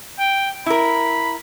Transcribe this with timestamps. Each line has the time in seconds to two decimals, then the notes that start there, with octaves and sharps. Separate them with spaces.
0.19 G5
0.66 E4 A#4 B5